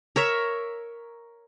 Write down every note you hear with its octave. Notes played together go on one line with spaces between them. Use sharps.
A#4 C#5 E5